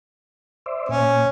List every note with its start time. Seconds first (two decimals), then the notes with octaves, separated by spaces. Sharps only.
0.66 C5 D5 E5
0.89 A#2 C#4